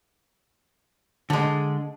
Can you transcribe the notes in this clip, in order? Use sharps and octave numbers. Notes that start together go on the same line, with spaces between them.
D3 G#3